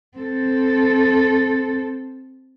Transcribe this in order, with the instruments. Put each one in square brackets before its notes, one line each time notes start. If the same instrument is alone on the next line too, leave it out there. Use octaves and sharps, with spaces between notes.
[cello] C4 A4